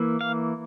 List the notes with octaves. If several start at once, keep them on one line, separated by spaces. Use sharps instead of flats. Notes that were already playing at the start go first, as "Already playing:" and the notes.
Already playing: E3 A#3 E4
F5